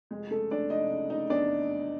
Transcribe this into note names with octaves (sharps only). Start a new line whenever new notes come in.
F1 G#3 G#4
C#3 A3 A4
F1 D4 D5
F1 D#4 D#5
C#3
C#3 D#4 D#5
E2 D4 D5